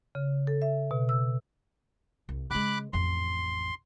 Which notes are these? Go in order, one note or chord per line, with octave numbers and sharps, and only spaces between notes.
C#3
A4
E5
B2
E6
C2
C#3 G#3 B5 D6 F#6
A1 F2 C6